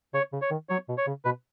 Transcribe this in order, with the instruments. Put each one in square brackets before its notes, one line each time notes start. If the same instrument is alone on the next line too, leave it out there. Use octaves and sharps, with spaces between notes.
[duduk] C#3 [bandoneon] C#5
[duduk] C#3
[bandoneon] C#5
[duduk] D#3
[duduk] F#3 [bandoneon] C#5
[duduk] B2
[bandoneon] C#5
[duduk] C#3
[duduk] B2 [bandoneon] B4